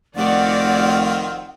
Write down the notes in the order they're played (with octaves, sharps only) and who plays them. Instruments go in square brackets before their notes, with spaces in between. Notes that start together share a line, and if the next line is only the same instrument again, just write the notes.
[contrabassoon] F1 [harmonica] D#3 C4 F4 [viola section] F#4 D5 [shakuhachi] F#5